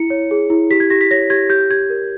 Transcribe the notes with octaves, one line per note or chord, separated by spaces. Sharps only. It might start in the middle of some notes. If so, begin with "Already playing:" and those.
Already playing: E4 C#7
C#5
G#4
E4
G4 B6
G#6
G4 A#6
B6
C#5 A#6
G4 G#6
G4 G6
G4 G#6
A#4